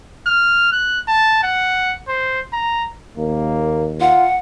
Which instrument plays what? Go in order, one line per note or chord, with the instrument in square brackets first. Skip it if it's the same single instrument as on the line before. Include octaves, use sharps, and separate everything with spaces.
[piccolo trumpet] F6
F#6
A5
F#5
C5
A#5
[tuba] D#2 [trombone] A#3
[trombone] F4 [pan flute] F#5